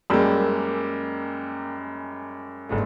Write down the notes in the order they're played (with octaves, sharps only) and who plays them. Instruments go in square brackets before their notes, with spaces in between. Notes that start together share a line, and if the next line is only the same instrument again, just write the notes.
[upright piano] F#2 G3 G#3 [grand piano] A#3 G4 E6
[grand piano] G1 G#2 A3